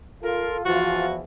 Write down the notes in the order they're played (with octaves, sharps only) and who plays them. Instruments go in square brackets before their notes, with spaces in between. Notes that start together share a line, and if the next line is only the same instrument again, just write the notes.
[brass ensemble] F4 A4 [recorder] A#4
[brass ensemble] E2 E3 F3 [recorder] F4 [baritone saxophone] F#4